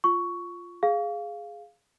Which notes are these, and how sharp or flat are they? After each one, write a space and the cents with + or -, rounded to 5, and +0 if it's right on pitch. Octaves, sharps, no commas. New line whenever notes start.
F4 +0 C#6 +10
G#4 +0 F5 +0